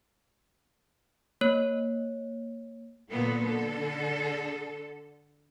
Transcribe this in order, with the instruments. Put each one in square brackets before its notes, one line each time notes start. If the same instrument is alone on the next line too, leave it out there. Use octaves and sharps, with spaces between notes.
[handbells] A#3 C#5
[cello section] A#2 D3 F#3 A#3 B3 A4
D3 A4